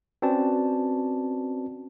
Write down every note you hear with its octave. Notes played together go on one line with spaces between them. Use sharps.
C4 C#4 F#4 B4 D5 A5